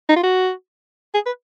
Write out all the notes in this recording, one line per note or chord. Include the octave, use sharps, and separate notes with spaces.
D#4
F4
F#4
G#4
B4